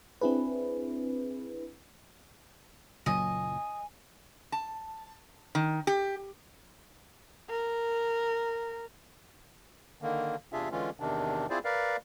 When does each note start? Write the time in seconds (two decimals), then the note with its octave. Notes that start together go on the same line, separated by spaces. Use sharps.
0.21 C4 D4 E4 G#4 B4
3.06 F#1 A#2 F#3 D#5 G#5
4.52 A5
5.55 D#3
5.87 G4
7.50 A#4
10.02 D3 D#3 A#3
10.53 E2 C3 D4 F4 G#4 E5
10.71 D3 E3 G#3 C#4 F4
11.00 E2 C3 D#3 D4
11.50 C4 E4 F4 G#4 C5 D5
11.65 A#4 B4 D5 F5